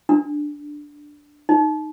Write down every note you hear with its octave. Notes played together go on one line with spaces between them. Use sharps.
D4
D#4